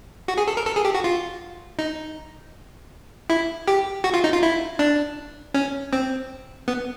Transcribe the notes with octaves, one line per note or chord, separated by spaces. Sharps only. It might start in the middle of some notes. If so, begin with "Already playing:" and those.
F#4
G#4
A4
A#4
A4
G#4
G4
F#4
F4
D#4
E4
G4
F#4
F4
D#4
F4
E4
D4
C#4
C4
B3